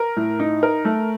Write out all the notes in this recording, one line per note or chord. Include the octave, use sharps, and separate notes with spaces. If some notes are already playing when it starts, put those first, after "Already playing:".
Already playing: A#4
A2
D#4
A#4
A3